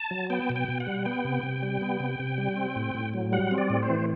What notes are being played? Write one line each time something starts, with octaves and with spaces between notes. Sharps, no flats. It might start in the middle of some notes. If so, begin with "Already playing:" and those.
Already playing: A5
F#3
B3 G5
B2
G5
B2
F#5
G3
B3 G5
C3
C3
G3
B3
C3
C3
G3
C4
A2
A2
F#3
G3 F#5
C4
D5
A2
C5
E3